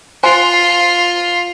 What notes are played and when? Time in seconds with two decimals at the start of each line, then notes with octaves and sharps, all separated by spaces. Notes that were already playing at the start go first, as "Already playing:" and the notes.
0.23 F4 C5 G#5 C6